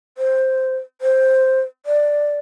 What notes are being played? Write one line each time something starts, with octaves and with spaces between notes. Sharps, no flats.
C5
C5
D5